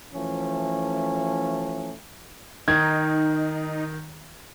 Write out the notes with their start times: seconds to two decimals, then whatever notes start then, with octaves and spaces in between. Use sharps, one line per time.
0.14 E3 F3 A3 C#4
2.68 D#3 D#4 G#6